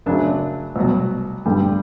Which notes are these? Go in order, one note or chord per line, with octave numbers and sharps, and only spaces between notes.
F#2 C#3 F#3 D4
C2 B2 F#3
G2 D3 G3